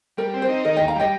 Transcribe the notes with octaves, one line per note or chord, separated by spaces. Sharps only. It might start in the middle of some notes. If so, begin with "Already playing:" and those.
G3 A#4
C4
C5
D#4
D#3 A#4 D#5
D#2 D#5 G5
F5 A#5
G3 D#5 G5